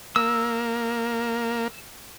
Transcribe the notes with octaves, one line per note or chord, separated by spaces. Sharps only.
A#3 E6